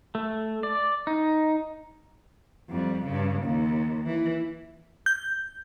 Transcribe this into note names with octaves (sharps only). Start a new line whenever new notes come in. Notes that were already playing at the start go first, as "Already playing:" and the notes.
A3
D5
D#4
F2 G3
G2 C#3
D#2
E3
G6